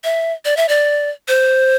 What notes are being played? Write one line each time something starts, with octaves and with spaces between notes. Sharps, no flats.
E5
D5
E5
D5
C5